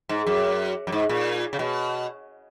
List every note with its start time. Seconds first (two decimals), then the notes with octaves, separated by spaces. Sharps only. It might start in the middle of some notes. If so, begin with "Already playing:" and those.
0.09 G#2
0.27 F#2
0.87 F#2
0.92 G#2
1.09 A#2
1.53 C#3
1.59 B2